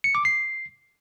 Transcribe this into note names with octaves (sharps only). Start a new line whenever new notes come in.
C#7
D6
C7